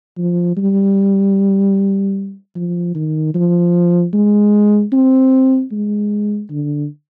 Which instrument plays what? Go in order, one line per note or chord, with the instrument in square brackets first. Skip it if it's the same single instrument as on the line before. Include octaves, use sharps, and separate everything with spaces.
[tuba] F3
G3
F3
D#3
F3
G#3
C4
G#3
D3